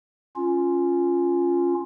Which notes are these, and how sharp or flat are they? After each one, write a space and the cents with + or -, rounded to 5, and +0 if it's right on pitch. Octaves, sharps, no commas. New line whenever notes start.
C#4 +0 F4 +0